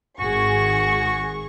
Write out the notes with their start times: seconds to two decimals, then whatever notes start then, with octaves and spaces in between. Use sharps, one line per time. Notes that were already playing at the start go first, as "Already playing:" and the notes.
0.20 G#1 F#4 G#4 C#6